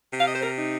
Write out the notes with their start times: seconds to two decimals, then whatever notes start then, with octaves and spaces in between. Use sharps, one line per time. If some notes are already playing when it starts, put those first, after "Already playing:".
0.12 C3
0.19 F5
0.27 D#5
0.34 C5
0.42 A#4
0.58 D#4